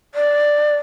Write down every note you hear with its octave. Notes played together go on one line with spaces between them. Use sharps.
D5